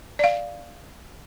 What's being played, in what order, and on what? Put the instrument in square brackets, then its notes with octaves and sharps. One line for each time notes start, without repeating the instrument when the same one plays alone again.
[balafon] D5 F5